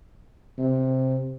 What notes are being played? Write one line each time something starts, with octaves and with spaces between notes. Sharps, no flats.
C3